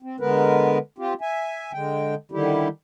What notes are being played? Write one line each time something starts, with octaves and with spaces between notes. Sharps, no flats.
C4
D3 G#3 B3 A#4 B4
C4 F4 G4
E5 G#5
D3 G#3 G5
D3 D#3 G3 E4 G4